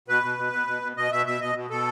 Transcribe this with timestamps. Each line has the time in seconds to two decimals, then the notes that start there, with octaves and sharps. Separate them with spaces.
0.08 B2 B4
0.23 B2
0.38 B2
0.53 B2
0.67 B2
0.82 B2
0.97 B2 D#5
1.12 B2 E5
1.26 B2 E5
1.41 B2 D#5
1.55 B2
1.70 B2 A4